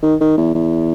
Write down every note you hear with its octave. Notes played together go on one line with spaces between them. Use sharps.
D#3
D#3
E2
E2